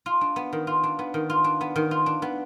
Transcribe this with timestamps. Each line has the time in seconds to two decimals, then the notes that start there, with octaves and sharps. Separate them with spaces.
0.06 F4
0.21 D4
0.36 B3
0.53 D#3
0.67 F4
0.83 D4
0.99 B3
1.14 D#3
1.30 F4
1.44 D4
1.61 B3
1.76 D#3
1.91 F4
2.06 D4
2.22 B3